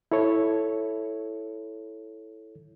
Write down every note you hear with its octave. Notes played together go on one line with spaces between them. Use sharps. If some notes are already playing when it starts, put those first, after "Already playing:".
E4 A4 C#5